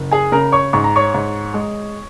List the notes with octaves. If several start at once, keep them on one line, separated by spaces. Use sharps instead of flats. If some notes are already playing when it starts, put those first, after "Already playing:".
Already playing: F#1
G#4 G#5
C#3 A#4 A#5
C#5 C#6
G#2 C#6
A#5
C#5 C#6
G#2
G#3